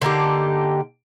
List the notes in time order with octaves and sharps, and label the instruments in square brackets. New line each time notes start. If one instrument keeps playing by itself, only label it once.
[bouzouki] D3 A#3 D#4 G4